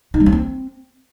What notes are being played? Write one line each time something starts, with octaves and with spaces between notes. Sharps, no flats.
D#4
G3
C#4
C4